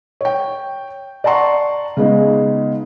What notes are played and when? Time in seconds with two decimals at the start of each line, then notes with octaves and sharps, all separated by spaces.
0.21 C#5 G5
1.24 D5 F#5 A5 A#5 C6 C#6
1.97 C#3 G#3 B3 D#4